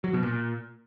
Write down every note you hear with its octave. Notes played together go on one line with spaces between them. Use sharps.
F#3
B2
A#2